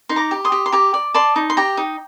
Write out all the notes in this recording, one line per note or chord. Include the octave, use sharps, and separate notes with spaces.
D#4 C6
A#5 D6
G4
C6 D#6
G4
C6
G4 A#5 D6
D5
D5 A5 C6
D#4
C6
G4 G5 A#5
D#4